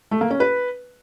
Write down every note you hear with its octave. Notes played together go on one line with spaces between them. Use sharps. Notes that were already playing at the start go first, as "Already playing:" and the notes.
A3
A#3
C#4
B4